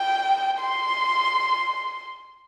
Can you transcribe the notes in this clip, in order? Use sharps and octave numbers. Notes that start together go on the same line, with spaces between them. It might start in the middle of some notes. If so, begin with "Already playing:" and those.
Already playing: G5
C6